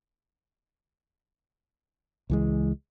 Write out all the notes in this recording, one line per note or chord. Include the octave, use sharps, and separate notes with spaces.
C#2 E3 G#3